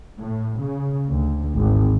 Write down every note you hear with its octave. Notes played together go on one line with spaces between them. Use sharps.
A2
C#3
D2
G#1